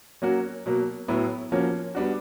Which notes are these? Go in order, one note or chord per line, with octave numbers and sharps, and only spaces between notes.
F#3 A#3 C#4 F#4
B2 F#3 A#3
A2 F#3 B3 E4
F3 A#3 C#4 F#4
G3 B3 D4 F#4